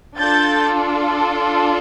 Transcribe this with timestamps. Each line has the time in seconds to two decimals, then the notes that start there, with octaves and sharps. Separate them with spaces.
0.18 D4 F4 A4 G6 A6